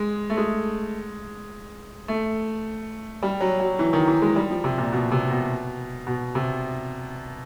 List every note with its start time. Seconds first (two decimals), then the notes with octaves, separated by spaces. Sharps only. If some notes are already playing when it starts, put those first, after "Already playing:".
Already playing: G#3
0.30 A3
0.37 G#3
2.08 A3
3.22 G3
3.40 F#3
3.60 F#3
3.79 E3
3.93 D#3
4.07 E3
4.22 G#3
4.36 G3
4.50 F3
4.64 C3
4.78 A#2
4.92 B2
5.11 C3
5.31 B2
6.07 B2
6.35 C3